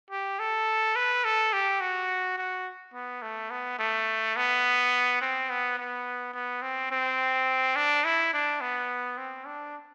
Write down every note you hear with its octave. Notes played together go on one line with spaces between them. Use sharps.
G4
A4
B4
A4
G4
F#4
F#4
B3
A3
B3
A3
B3
C4
B3
B3
B3
C4
C4
D4
E4
D4
B3
C4
D4